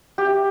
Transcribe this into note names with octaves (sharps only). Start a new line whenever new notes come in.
G4